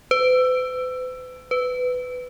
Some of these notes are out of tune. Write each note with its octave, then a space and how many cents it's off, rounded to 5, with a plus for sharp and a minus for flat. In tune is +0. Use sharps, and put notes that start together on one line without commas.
B4 +45
B4 +20